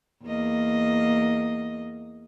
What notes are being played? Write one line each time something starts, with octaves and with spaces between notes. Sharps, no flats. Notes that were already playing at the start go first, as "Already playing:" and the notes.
E2 A#3 D#5